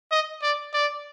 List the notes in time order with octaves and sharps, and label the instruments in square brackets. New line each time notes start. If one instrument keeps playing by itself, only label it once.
[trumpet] D#5
D5
D5